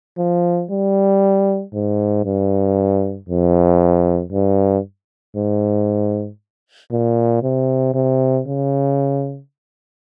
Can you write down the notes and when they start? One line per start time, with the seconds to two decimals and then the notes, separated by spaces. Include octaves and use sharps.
0.18 F3
0.70 G3
1.73 G#2
2.25 G2
3.29 F2
4.32 G2
5.36 G#2
6.92 A#2
7.43 C3
7.94 C3
8.47 C#3